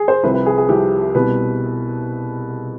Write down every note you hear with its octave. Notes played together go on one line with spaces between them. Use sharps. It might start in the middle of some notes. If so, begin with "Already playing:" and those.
Already playing: G#4
C5
C2 C3 F3 B4
B4
G#4
G#4
C2 C3 F3 G4
C2 B2 G3 B4